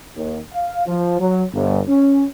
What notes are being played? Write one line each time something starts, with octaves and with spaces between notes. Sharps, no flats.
D#2
F5
F3
F#3
G1
C#4